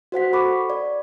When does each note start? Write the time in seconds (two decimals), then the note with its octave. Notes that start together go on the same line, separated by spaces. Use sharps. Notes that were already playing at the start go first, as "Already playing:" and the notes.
0.12 F#4 C5 F#5 B6
0.33 A4 B5 C#6 D6
0.70 D5